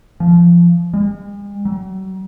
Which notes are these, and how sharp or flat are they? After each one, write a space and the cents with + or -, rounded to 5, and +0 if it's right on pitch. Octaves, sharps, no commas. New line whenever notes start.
F3 -20
G#3 -45
F#3 +40